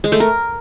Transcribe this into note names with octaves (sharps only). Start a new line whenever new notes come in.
G#3
A3
A#4